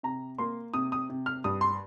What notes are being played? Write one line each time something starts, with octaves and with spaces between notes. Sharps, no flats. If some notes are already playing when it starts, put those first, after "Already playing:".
C3 A#5
A#3 C6
C3 D#6
D#6
C3
F6
G2 D#6
C6